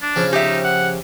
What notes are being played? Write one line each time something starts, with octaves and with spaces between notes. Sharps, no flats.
D4
C#3 F3 C#4
D#4 G4 E5
F#5